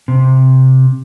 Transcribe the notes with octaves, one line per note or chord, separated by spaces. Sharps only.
C3